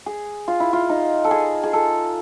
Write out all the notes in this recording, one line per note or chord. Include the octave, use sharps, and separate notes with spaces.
G#4
F4
E4
F4
D#4
A4
G#4
G#4
A4